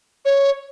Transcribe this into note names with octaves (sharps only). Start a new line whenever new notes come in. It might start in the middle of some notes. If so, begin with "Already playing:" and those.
C#5